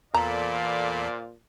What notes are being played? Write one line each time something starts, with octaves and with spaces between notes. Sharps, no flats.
E2 A#2 A4 C5 D5 F5 A#5 B5